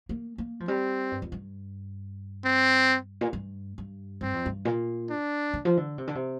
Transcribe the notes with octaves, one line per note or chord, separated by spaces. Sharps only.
A#3
A#3
F3
G3 C4
G2
F2
G2
C4
A#2
G2
G2
G2 C4
F2
G2
A#2
D4
D3
F3
D3
C3
D3
C3